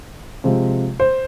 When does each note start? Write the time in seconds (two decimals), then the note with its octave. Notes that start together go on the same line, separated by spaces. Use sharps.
0.44 C3 F3 G#3
1.00 C5